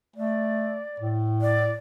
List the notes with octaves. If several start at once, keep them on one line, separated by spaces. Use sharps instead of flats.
A3 D5
A2
D5